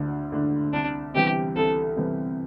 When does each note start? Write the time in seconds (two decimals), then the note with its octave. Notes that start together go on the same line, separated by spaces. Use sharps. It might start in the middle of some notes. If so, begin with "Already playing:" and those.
Already playing: D2 D3 A3 D4
0.32 D3 A3 D4
0.73 C2 D4
1.14 C3 E3 G3 B3 G4
1.56 C2 A4
1.96 C3 E3 G3 B3